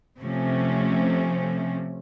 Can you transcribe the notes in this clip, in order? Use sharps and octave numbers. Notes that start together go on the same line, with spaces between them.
C3 F3 A3 C#4